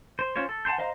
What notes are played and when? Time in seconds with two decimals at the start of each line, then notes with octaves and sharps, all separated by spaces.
0.19 C5
0.36 C#4 F4 C5 C#5
0.49 A4
0.65 F#5 G#5 A5 C6 G6
0.78 C5 D#5 F5 A#5 C6